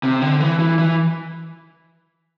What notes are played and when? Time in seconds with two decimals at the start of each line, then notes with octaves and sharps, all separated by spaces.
0.03 C3
0.22 D3
0.41 E3
0.59 E3
0.79 E3